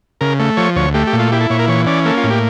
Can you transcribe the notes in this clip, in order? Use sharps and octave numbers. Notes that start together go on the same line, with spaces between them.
C#3 A#4
A3
F3 C#5
D2 C#5
A3 G4
G4
A#2
F4
E4 G4
A4
A#2 C#5
A#4
E3 C#5
C#4 D5
A#3 A4
F4
A2
G4